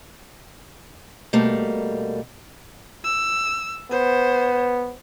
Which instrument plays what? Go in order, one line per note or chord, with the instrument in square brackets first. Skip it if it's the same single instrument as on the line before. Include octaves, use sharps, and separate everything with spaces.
[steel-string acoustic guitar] B2 G3 A3 A#3
[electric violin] E6
[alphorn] B3 [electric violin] C5